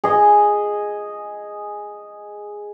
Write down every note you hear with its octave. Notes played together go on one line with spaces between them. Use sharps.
G#4 D#5